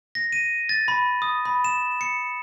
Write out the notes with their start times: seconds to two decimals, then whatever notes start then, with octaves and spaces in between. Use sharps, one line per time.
0.15 A#6
0.32 D#7
0.69 A6
0.88 B5
1.22 D#6
1.45 B5
1.64 E7
2.01 C#7